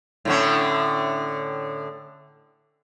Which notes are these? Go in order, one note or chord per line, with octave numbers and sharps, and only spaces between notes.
A2 D3 C#4